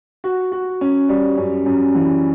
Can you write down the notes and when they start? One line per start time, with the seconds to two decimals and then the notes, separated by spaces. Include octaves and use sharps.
0.24 F#4
0.52 F#4
0.81 C#4
1.09 G3
1.37 F#2
1.66 F#2
1.95 E3